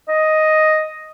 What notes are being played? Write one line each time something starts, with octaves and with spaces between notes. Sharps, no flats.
D#5